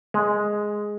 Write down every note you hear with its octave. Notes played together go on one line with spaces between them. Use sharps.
G#3